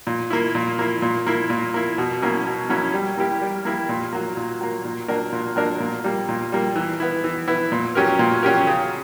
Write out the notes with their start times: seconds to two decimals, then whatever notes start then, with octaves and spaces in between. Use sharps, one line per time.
0.07 A#2
0.30 A#3 E4
0.55 A#2
0.79 A#3 E4
1.02 A#2
1.27 A#3 E4
1.50 A#2
1.74 A#3 E4
1.98 B2
2.22 F#3 A#3 C#4 E4
2.46 B2
2.69 F#3 A#3 C#4 E4
2.94 G3
3.17 A#3 E4 G4 A#4
3.42 G3
3.65 A#3 E4 G4 A#4
3.89 A#2
4.13 F#3 A#3
4.37 A#2
4.61 F#3 A#3
4.85 A#2
5.08 F#3 A#3 D4 A#4
5.32 A#2
5.56 F#3 A#3 D4 A#4
5.80 A#2
6.04 G3 A#3
6.29 A#2
6.52 G3 A#3
6.76 E3
7.00 B3 E4
7.24 E3
7.48 B3 E4
7.72 A#2
7.95 F#3 C#4 G4 A#4
8.19 A#2
8.43 F#3 C#4 G4 A#4
8.67 C#3